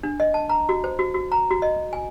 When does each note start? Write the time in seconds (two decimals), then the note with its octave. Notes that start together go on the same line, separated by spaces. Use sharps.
0.03 D4
0.20 D#5
0.34 A5
0.49 A#5
0.69 F#4
0.84 C5
0.99 F#4
1.14 F#4
1.32 A#5
1.50 F#4
1.62 D#5
1.93 G#5